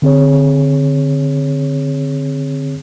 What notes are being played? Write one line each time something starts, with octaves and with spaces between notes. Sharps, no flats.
D3 C4 G#4 C#5